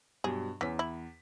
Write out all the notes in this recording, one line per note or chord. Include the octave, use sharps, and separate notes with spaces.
G2 B2 F#3 G#4
E2 E3 C#4 B6
E4